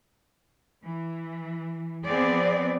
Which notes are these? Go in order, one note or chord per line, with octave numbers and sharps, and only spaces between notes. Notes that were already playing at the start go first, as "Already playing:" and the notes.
E3
F3 B3 C4 G#4 D5